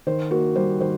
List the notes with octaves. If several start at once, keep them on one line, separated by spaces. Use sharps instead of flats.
D#3 C5
A#3 F#4
G3 C5
D#3 C5